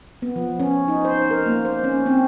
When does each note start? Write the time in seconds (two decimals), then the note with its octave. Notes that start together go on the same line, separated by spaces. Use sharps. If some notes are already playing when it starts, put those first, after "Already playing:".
0.22 B3
0.36 F3
0.60 C#4
0.88 D#4
1.05 C5
1.31 A#4
1.46 A#3
1.65 C5
1.84 C#4
2.06 C4